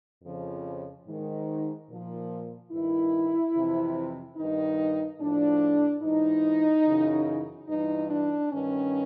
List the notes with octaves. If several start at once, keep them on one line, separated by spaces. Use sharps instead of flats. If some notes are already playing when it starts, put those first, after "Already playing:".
F2 C#3 F3
G#2 D#3
A#2 F3
G2 D#3 E4
F2 C3 E3
G2 D#3 D#4
A2 F3 D4
G#2 E3 D#4
F#2 C#3 E3
G2 E3 D#4
D4
G2 D#3 C#4